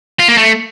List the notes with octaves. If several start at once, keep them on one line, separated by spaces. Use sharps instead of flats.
F4
A#3
A3